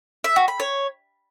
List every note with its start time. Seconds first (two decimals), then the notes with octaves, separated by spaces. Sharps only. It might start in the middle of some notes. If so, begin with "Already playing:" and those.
0.24 E5
0.36 F#4
0.48 B5
0.60 C#5